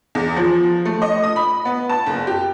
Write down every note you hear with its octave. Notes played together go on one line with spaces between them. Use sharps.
E2
F3
A3
D#5
D#6
B5
B3
A5
F#1
G4